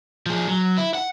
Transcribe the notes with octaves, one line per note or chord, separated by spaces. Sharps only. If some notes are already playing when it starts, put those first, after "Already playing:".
F3 G#4
F#3
E4
F#5